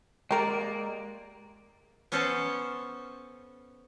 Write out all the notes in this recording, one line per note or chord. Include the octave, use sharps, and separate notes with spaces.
G#3 A#3 G4 A#4 D5
B3 C#4 A4 C5 C#5 A5